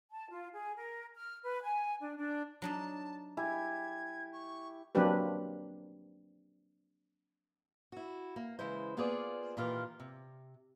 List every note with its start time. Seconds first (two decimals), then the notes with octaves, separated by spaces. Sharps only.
0.10 A5
0.30 F4
0.52 G#4
0.76 A#4
1.15 F6
1.43 B4
1.63 G#5
2.00 D4
2.17 D4
2.62 F#3 D4 D#4 A5
3.37 E4 G4 G#5 G#6
4.32 C#6
4.95 F#3 A#3 C4 D4 G4 B4
7.92 E4 F#4
8.36 A#3
8.59 C#3 E3 G#3 E4 C5
8.97 A#3 B3 F4 G#4 C5 D5
9.57 A#2 D#3 E3 F4 G4 A#4
10.00 C3